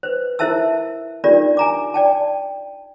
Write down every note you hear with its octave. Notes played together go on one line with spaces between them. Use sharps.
B4 C5
E4 A#4 C5 E5 A5 E6
D4 D#4 F4 G4 A#4 D5
G#5 A#5 D6
D5 G5 A5